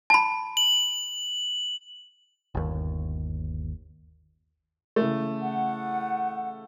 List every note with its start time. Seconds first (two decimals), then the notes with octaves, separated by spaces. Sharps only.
0.10 A5 B5
0.57 F#7
2.55 G1 D#2
4.96 C#3 E3 A3
5.41 F#5